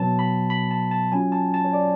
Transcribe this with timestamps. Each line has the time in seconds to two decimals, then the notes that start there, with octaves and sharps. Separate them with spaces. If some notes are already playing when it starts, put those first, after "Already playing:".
Already playing: B2 F#3 B3 A5
0.19 B5
0.50 B5
0.71 A5
0.91 A5
1.12 F#3 C#4 F4 G#5
1.32 A5
1.54 A5
1.65 C#5
1.73 D5